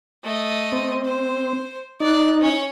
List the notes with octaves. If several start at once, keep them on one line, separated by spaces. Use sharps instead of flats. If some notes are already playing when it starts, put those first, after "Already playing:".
A3 D#5
C4
C5
D#4 D5 F#6
C#4 C#5